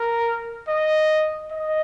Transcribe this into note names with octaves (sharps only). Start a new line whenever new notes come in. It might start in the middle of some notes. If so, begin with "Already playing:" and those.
Already playing: A#4
D#5
D#5